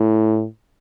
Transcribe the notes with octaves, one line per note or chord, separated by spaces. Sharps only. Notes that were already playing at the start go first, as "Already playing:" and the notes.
Already playing: A2